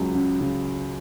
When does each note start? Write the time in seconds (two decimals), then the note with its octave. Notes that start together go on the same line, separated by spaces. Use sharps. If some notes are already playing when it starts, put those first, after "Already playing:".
Already playing: C#2 F#3
0.14 C#3
0.41 C#3